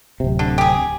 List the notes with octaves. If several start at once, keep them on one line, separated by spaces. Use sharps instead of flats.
D1 C3
D3
G4 G#4